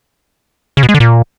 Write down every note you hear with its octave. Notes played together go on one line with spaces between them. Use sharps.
C#3
B2
G#3
D3
A#2